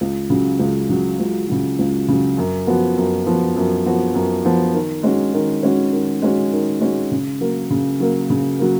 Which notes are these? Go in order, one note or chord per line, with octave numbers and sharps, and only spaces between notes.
C#2
C#3 F#3
C#2
C#3 F#3
C#2
C#3 F#3
C#2
C#3 F#3
F#2
F3 B3 F#4
F#2
F3 B3 F#4
F#2
F3 B3 F#4
F#2
F3 B3 F#4
D#3
G#3 C#4 F#4
D#3
G#3 C#4 F#4
D#3
G#3 C#4 F#4
D#3
G#3 C#4 F#4
C#3
F#3 A#3
C#3
F#3 A#3
C#3
F#3 A#3